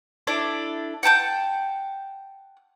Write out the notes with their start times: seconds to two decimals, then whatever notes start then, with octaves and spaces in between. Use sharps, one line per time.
0.27 D4 E4 A4 D5
1.03 F#5 G5 A5 G6